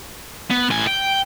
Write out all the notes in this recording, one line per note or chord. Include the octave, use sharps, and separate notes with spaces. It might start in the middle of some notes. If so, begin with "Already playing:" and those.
B3
A2 G#5
G5